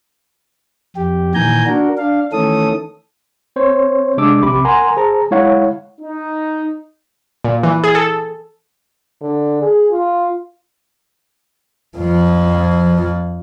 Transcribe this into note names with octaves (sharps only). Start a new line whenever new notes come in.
F2 G4
A#2 D#3 E3 G#5 A#5 G6
D4 F#4 A#4
D4 F5
D#3 E3 A3 C#4 A4 D#6
C4 C5 C#5
C3 G#3 D4 D6 E6
A#1 C3 B5 D6
A#4 F#5 G#5 A#5 C6
G#4 C5 A5 A#5
G#3 E4 C#5 F5 F#5
D#4
A#2
E3
G#4
A4
D3
G#4
F4
F2 F3